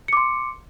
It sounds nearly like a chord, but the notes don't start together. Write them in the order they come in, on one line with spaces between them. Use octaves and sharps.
C#7 D6 C6